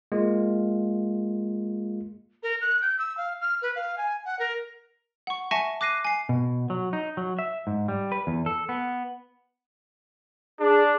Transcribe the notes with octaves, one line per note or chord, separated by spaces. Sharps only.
G#3 A#3 F4
A#4
F#6
G6
E6
F5
F6
B4
F5
G#5
F#5
A#4
F#5 C#6
E5 G#5 A5 C#6 A#6 C#7
D6 F#6 A#6 C7 D#7
G#5 C7
B2
F#3
D#4
F#3
E5
G#2
G3
B4
E2
A4
B3
D4 G#4